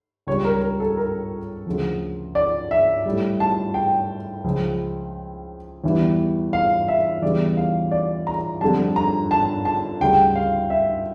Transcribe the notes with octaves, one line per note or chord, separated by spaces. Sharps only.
C#2 C#3 G3 C#5
A#4
A#4
A4
A#4
D2 C#3 F3
D5
E5
A2 G3
A5
G5
C#2 C#3 F3
E2 E3 G3
F5
E5
E2 C#3 E3 G3 D5
F5
D5
A#5
F2 D3 G3 A5
A#5
A5
A5
D2 C#3 G3 G5
F5
E5